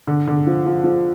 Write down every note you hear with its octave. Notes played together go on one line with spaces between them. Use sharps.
D3
D3
F3
F3
F3